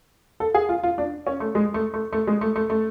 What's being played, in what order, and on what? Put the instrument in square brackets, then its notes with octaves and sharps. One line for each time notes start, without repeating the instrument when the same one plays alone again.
[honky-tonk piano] A4
G#4
F4
F4
D4
C#4
A3
G#3
A3
A3
A3
G#3
A3
A3
A3